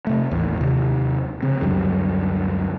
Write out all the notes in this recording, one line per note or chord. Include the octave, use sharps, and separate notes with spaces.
C3 A3
A1 D#2 D#3
D#2 C3
C#3 C4
C#2 F#2 D3 G3